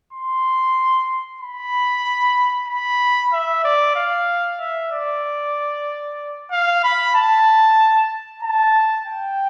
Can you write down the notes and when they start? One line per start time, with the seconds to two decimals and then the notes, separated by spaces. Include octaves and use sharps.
0.13 C6
1.41 B5
2.68 B5
3.33 E5
3.64 D5
3.96 F5
4.60 E5
4.92 D5
6.51 F5
6.84 B5
7.15 A5
8.43 A5
9.06 G5